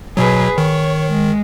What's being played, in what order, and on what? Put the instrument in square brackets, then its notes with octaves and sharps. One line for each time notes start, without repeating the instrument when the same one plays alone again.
[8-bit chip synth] B2 F#3 [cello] G#4 B4
[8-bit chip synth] D#3 [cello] C#5
[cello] G#3